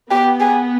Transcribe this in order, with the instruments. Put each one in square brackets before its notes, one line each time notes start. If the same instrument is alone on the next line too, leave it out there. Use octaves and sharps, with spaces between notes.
[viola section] B3 [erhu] G4
[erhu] G#4